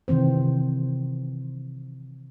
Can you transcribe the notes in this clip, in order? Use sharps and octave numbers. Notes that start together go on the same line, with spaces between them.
C3 D#3 E3 C4 C5